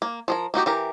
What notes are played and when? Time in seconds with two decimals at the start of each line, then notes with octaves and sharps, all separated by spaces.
0.02 A#3
0.28 F3 G#4 A#4
0.54 A#3 D#4 F#4 G4
0.66 E3 G4 A#4